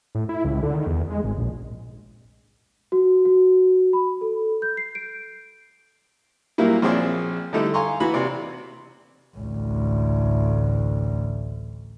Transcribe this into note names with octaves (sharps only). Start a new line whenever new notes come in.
A2
E4
C#2
D3
D#3
E2
G#3
G#1
A#1
F#4
F#4
B5
A4
G6
C7
D7
A#2 F#3 G3 A#3 E4
A#1 C4 G#4 C#5 D5 E5
D3 G3 A3 D#4 E4 A4
F5 G#5 A#5 C6 C#6
E3 F#4 B5
C3 D5
A1 D2